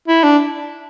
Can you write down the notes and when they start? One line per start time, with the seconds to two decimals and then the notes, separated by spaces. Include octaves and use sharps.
0.08 E4
0.23 D4